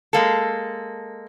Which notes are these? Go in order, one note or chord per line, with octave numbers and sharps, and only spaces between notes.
G#3 A#3 A4